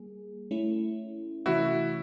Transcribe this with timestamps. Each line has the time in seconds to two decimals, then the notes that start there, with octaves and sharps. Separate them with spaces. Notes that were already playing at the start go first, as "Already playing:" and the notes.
Already playing: G3 A#3 G#4
0.51 A3 C#4 E4
1.46 C3 E3 A3 C#4 E4 F#4